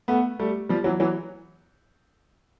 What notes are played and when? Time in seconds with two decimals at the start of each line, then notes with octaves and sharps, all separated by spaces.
0.08 A3 B3
0.39 G3 A3
0.69 F3 G3
0.84 E3 F#3
1.00 E3 F#3